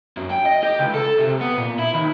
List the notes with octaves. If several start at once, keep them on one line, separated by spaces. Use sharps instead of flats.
F#2
G5
D#5
G4
C#2
A4
C3
B3
A#2
E4
D#2